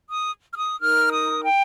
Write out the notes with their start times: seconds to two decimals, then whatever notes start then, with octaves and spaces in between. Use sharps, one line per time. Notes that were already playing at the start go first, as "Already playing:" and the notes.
0.09 D#6
0.51 F6
0.57 D#6
0.81 D#4 A#4 F6
1.13 D#6
1.44 G5